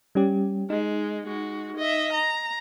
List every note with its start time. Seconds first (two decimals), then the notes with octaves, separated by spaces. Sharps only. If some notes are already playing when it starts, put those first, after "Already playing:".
0.15 G3 C#4 G4
0.70 G#3 D#4
1.25 G#3 F#4
1.77 D#5 E5
2.13 A#5